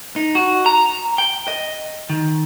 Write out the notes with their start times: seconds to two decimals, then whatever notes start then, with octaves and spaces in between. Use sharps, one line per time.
0.16 D#4
0.35 F#4
0.66 A#5
1.18 G5
1.48 D#5
2.10 D#3